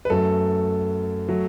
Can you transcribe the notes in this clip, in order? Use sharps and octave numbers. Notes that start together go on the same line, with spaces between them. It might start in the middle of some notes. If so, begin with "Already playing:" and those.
B4
F#2 F#3 A3 A4
F#3 A3